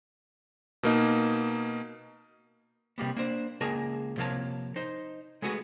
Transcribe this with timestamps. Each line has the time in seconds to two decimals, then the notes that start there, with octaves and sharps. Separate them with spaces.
0.83 B2 A#3 D#4
2.98 C3 G3 A#3 B3
3.17 A#3 D4 C5
3.61 C#2 A#3 G#4 A#4 A5
4.18 C3 F3 A#3 A#4 C#5 A5
4.76 D#4 C5
5.42 G#3 A3 B3 F#4 G#4